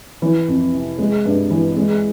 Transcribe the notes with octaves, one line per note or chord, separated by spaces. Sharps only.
E3
F2
C3
G#3
G2
E3
G#3